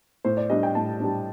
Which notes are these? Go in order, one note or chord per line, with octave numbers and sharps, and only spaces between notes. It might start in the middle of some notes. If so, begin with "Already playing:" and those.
A2 C5
D5
G3 D4 D#5
G5
A2 A5
G3 D4